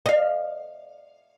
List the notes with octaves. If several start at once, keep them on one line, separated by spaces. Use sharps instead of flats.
D#5 F5